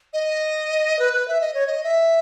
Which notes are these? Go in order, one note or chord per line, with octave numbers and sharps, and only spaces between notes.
D#5
B4
B4
E5
D#5
C#5
D#5
E5